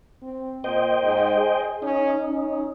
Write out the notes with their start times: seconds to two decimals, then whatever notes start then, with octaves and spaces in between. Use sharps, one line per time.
0.22 C4
0.64 A#2 C5 D#5 G5
1.03 G#2
1.37 G#4
1.82 C#4 D#4
2.29 C#4